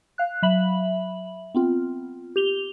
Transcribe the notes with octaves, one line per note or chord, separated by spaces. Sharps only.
F5 F#6
F#3 E5 B5 F#7
B3 C4 F4
G4 F7 G7